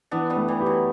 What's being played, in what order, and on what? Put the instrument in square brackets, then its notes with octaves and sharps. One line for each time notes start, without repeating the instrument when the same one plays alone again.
[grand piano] E3 [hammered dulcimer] B3 D4
[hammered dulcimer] G3 B3
[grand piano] A3
[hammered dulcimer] E3 G3
[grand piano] G4
[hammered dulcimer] F#3